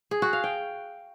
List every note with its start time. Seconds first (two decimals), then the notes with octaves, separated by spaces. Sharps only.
0.11 G#4
0.22 F#4
0.33 F5
0.44 G5